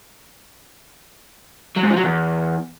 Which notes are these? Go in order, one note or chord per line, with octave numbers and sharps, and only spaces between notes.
F#3
G#2
F3
F#3
E2